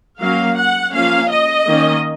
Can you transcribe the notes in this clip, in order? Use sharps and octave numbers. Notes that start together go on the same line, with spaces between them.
F#3 A#3 C#4 F5
F#5
F3 A#3 C#4 F5
D#5
D#3 A#3 C#4